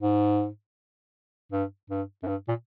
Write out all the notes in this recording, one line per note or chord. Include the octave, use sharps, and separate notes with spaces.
G#2
G2
G2
F#2
G2
A#2